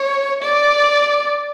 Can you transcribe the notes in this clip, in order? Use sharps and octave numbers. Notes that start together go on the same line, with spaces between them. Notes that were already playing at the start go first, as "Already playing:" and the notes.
Already playing: C#5
D5